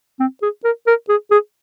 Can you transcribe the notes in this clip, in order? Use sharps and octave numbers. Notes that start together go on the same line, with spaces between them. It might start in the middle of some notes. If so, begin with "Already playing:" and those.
C4
G#4
A#4
A#4
G#4
G#4